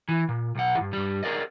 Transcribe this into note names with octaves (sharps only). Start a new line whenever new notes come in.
E3
A#2
B1 F#5
E2 G2
G2 G3
G#4 A#4 D5 D#5